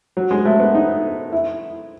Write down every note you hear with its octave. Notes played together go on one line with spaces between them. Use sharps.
F#3
G#3
A3
B3
D#4
E4